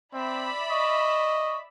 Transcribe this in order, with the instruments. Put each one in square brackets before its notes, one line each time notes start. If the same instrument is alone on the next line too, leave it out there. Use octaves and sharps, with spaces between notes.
[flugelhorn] C4 [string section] D5 E5 B5
[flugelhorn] D#5 [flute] C#6